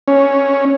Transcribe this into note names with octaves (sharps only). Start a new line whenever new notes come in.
C#4